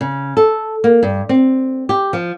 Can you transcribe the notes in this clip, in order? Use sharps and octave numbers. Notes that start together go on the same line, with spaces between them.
C#3
A4
A#3
G2
C4
G4
F3